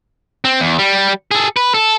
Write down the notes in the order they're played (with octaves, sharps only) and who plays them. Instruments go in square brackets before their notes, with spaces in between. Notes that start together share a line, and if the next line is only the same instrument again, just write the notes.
[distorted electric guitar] C4
E2
G3
G#4 A4
B4
A4